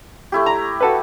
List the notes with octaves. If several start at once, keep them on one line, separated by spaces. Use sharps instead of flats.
A3 E4 G4
A#5
F#4 A4 B4